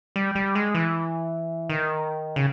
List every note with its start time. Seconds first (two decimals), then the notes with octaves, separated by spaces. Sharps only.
0.16 G3
0.35 G3
0.55 G#3
0.75 E3
1.70 D#3
2.36 C#3